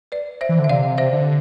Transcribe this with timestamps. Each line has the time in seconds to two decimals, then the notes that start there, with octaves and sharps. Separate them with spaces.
0.12 B4 D5
0.41 C5 E5
0.49 E3
0.59 D3
0.64 E5
0.69 C3 D5 F5
0.98 C5 E5
1.13 D3